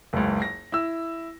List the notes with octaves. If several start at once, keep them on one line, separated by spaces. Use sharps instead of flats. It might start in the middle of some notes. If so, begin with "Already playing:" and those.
F#1 C#2
A#6
E4 E6